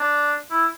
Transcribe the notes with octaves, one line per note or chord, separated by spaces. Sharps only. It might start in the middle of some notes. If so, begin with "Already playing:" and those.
Already playing: D4
E4